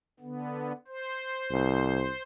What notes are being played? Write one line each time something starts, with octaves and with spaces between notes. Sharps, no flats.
D3 B3
C5
C2